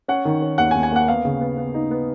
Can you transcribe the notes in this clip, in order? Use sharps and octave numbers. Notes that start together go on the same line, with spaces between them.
C#4 F#5
D#3
C#4
D#2 F#5
G#5
D#2
G#5
A#3 F#5
B3 F5
C#3
B3
B3
D#4
B3